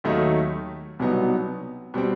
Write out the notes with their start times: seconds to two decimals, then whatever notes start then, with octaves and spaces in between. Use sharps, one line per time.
0.04 D#2 D#3 F#3 A3 D#4
0.99 C2 B2 F#3 B3 D#4
1.94 B2 G3 C4